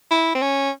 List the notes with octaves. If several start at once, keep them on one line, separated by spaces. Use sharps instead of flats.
E4
C4
C#4